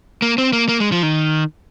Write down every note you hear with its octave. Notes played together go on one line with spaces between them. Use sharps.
A#3
C4
A#3
A#3
G#3
F3
D#3